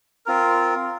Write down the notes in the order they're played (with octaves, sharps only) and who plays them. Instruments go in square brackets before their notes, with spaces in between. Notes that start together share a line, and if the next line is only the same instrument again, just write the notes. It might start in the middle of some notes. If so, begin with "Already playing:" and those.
[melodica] C4 F4 A#4